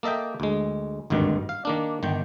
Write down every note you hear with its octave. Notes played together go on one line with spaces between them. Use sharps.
A#3 A4 D#5 E5 G5
D2 G#3
G#1 D2 G2 D#3
F5
D#3 A#3 D4
G1 D#3 G5